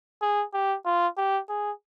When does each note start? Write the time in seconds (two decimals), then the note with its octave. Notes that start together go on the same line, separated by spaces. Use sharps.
0.22 G#4
0.54 G4
0.85 F4
1.17 G4
1.49 G#4